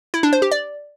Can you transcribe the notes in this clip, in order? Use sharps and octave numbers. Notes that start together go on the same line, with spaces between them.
E4
D4
C5
G4
D5